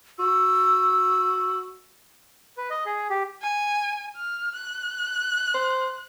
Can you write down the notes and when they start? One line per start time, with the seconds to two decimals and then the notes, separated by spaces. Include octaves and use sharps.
0.19 F#4 E6
2.57 B4
2.70 D#5
2.86 G#4
3.10 G4
3.42 G#5
4.17 F6
4.55 F#6
5.54 C5